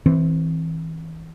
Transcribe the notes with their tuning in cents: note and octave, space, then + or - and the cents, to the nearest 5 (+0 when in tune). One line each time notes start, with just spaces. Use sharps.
E3 -30 C4 +0